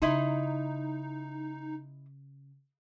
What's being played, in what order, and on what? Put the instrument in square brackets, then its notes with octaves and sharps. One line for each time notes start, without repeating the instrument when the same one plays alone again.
[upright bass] C#3 [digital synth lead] D#4 [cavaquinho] E4 D#5 C6